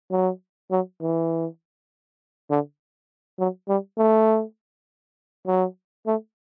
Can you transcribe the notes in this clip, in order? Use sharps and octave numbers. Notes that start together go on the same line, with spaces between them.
F#3
F#3
E3
D3
F#3
G3
A3
F#3
A3